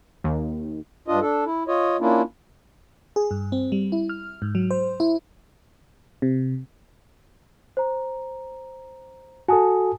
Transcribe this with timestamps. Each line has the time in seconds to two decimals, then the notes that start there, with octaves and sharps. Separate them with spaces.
0.24 D#2
1.08 G2 D4 F4 D#5
1.21 D4 A4
1.46 E4
1.68 F4 C#5 D#5
2.00 A#3 C#4 D4 E4 F4
3.16 G#4
3.31 G2
3.52 C4
3.72 G3
3.92 E4
4.09 F6
4.42 G#2
4.55 F#3
4.71 C5
5.00 E4
6.22 C3
7.77 C5 A#5
9.48 F#4 A4 G#5 A5 D#6